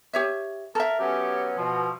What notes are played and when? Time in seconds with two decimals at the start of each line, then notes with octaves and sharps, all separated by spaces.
0.13 G4 C#5 E5
0.75 A4 A#4 E5
0.99 F#3 B3 C#4 G4
1.58 B2 F3